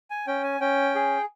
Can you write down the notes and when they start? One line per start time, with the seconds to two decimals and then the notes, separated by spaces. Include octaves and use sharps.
0.11 G#5
0.27 C#4 G5
0.44 G#5
0.61 C#4 G5
0.95 G#4